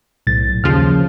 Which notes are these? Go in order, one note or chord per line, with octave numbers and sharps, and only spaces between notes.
B1 A2 A6
D#2 C#3 F3 F6